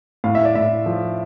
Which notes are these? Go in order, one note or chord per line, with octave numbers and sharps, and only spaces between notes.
A2 F5
E5
D5
A2 E5
F3